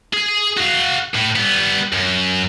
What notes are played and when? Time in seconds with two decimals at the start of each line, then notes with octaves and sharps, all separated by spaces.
0.14 G#4
0.57 F#4 F5
1.14 A2
1.36 G3 B3
1.93 F#2